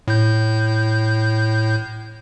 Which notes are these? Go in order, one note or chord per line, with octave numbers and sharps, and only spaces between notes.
A2 G6